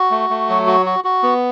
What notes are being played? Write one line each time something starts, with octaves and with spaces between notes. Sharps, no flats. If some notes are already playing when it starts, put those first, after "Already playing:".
Already playing: F#4
A3
A3
F#3
F#4
F#4
F#4
B3